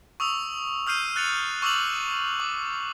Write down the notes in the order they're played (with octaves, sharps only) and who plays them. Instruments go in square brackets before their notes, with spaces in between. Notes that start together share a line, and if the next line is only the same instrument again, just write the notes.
[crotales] C#6 D#6 E6 F7
D#6 F6 G6 C7 D#7
F#6 A6 C#7 F7
C#6 D6 E6 A6 F7 F#7
D6